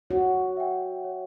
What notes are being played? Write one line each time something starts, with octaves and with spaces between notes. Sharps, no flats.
F#4 C#5
E5 G5
C#5